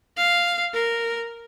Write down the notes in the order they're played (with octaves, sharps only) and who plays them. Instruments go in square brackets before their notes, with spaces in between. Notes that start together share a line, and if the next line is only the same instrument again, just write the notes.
[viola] F5
A#4